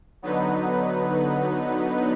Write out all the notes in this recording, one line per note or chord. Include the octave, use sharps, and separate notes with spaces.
D3 F#3 B3 D#4 B4